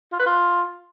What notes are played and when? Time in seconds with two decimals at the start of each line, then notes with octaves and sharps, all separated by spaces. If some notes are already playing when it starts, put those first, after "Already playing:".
0.12 F4
0.19 B4
0.26 F4